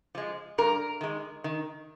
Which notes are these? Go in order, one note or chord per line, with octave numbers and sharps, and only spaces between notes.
F3 G#3
G2 A#4
D#3 G#3
D#3